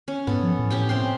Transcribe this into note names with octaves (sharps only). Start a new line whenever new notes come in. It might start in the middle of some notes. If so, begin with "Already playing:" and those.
C#4
G#2 B3 A4
F3
A2
C#4 G4 G5
C3 G5 C6